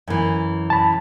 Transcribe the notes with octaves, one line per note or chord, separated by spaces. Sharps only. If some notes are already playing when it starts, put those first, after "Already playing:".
F#2 E3
A5 B5